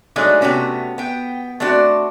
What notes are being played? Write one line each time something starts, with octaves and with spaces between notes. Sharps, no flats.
F#3 G#3 A3 D4 D#4
C3 A3 B3 C#4 F#4
B3 G5
A3 C4 D4 F#4